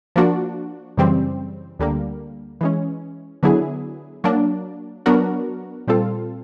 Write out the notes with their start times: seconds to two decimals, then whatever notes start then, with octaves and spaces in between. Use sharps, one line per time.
0.16 F3 A#3 D4 F#4
0.97 F#2 C#3 E3 G3 C4
1.79 D2 D3 G3 A#3
2.61 E3 G#3 C#4
3.43 D3 F#3 B3 E4 G#4
4.24 F#3 A#3 D4
5.06 F#3 B3 D4 F#4 A#4
5.87 A#2 G3 C4 F4 A4